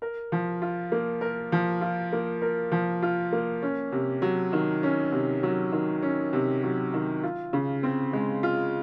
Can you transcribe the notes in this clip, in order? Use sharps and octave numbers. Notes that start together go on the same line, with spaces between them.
A#4
F3
F4
A#3
A#4
F3
F4
A#3
A#4
F3
F4
A#3
C#4
C3
F#3
D#3
C#4
C3
F#3
D#3
C#4
C3
F#3
D#3
F4
C#3
C4
G#3
F4